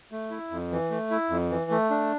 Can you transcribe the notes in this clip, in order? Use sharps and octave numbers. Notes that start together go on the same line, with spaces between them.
A3
E4
F2
E3
A3
E4
F2
E3
A3
D4